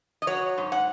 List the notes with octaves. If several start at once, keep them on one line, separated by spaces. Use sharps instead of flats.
D#5
F#3 C#5
G#2
F#5